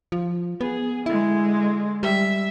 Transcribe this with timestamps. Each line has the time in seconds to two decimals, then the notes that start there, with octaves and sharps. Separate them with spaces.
0.12 F3
0.61 B3 G#4
1.06 D3 G#3 E4
2.03 G3 E5